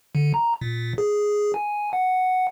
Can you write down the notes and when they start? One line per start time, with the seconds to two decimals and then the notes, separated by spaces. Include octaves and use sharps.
0.15 D3
0.34 A#5
0.61 A#2
0.98 G#4
1.54 G#5
1.93 F#5